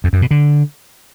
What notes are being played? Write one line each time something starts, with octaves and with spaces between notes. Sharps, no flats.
F2
F#2
B2
D3